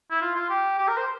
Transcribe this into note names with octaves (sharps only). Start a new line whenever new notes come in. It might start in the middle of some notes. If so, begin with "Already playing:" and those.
E4
F4
F4
G4
G4
A#4
C5